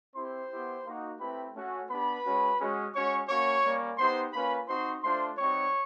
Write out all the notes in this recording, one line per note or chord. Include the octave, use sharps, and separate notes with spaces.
C4 E4 G4 C5 C6
B3 E4 G4
A#3 D#4 F#4
A3 C4 E4 G4 B4 B5
A3 C#4 F#4
B3 D4 G4 B4 B5
G#3 C#4 F#4
G#3 C#4 F#4
G#3 C#4 F#4 C#5 C#6
A#3 C#4 F#4 C#5 C#6
G3 A#3 C#4
B3 D#4 G4 C5 C6
A#3 C#4 F4 B4 B5
C4 D#4 F#4 C5 C6
A3 D4 F4 C5 C6
G3 C4 D#4 F#4 C#5 C#6